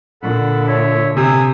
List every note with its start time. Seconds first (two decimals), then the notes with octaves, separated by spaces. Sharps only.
0.22 A#2 D3 A4 F#5 B5
0.68 C#5 E5
1.17 C3 G#5 D#6 E6